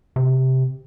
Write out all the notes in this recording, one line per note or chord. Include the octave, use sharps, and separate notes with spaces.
C3